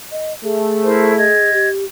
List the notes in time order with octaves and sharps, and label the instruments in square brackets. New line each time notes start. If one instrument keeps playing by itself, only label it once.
[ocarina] D#5
[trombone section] A3 [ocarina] G#4
[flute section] E4 A#4 C5
D#5 G#6
[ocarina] G4